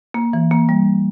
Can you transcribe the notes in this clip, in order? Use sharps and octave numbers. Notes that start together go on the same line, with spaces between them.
A#3
E3
A#3
G3